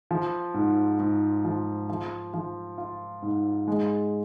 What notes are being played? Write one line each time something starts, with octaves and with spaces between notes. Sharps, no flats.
F3
G#2
G#2
F3
F3
F3
F4
G#2
G#3